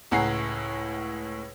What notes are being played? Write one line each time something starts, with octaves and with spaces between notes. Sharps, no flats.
C#2 A2 F#5 G#5 A#5 C7